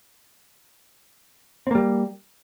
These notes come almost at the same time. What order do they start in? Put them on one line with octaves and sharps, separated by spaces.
C4 A#3 G3